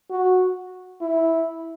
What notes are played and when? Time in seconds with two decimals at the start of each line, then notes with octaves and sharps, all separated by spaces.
0.10 F#4
1.01 E4